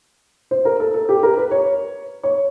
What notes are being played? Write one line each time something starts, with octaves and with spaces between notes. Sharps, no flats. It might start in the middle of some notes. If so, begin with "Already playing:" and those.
C5
A#4
A4
A4
G4
A#4
B4
C#5
C#5